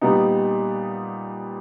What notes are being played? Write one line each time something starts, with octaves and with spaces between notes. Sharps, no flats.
A#2 G3 B3 D#4